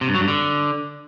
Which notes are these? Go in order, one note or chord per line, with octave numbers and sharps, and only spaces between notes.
C3
G2
F#3
G2
D3